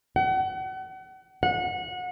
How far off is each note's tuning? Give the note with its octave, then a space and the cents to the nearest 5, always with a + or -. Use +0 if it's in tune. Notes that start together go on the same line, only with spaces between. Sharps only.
F#5 +35
F#5 -30